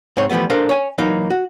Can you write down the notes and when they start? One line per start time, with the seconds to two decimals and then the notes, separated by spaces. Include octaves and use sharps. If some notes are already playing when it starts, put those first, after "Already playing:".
0.17 G#2 C4 C#5
0.30 E3 F3 G3 A3 B3
0.50 D4 A4 A#4 C5 F5
0.69 C#5 G#5
0.98 E3 F#3 A#3 D#4
1.30 F#4